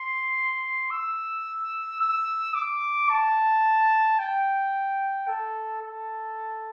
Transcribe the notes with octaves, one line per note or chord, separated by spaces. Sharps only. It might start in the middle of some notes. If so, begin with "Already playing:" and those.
Already playing: C6
E6
E6
D6
A5
G5
A4
A4